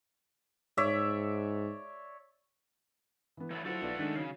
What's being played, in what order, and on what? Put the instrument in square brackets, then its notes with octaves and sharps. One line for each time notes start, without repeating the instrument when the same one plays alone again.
[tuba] G#2 [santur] C#5 D5 E5
[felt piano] E3 B3
[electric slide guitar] E3 F#3 A3 [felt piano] B5
[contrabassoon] F#3 [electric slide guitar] A3 A4 F#5 [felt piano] E4 F4 C5
[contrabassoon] B1 [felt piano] F4 B4 D5
[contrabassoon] D#3 [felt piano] G#3 D4 B6
[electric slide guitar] C#3 [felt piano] F#3 C7